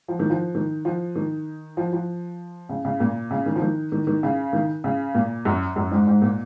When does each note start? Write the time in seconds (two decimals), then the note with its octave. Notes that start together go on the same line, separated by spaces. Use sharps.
0.08 F3
0.19 D#3
0.30 F3
0.55 D#3
0.85 F3
1.15 D#3
1.77 F3
1.93 F3
2.69 C#3
2.85 C#3
3.00 A#2
3.31 C#3
3.46 D#3
3.56 F3
3.62 D#3
3.92 D#3
4.07 D#3
4.23 C#3
4.53 D#3
4.84 C#3
5.15 A#2
5.45 F#2
5.76 F#2
5.91 G#2
6.07 G#2
6.22 A#2